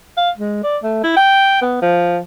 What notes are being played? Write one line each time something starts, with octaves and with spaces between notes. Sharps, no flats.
F5
G#3
D5
A3
E4
G5
B3
F3